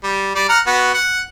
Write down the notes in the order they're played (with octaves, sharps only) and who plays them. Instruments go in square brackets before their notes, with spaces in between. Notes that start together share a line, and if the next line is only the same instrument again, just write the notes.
[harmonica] G3
G3 D5
F#5 A#5 F6
B3 F#4
F#5